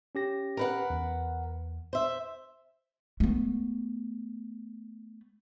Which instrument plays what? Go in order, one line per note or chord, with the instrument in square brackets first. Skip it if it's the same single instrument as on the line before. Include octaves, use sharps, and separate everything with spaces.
[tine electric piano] C#4 G4 A#6
[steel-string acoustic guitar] A#4 B4 F#5
[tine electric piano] E2
[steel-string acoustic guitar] C5 E5
[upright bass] A3 B3